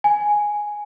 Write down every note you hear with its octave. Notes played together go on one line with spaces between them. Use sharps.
G#5